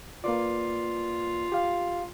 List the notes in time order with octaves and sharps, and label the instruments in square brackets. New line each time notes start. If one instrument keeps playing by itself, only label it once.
[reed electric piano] A#3 B4 D5 [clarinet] F4
[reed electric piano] G4 F5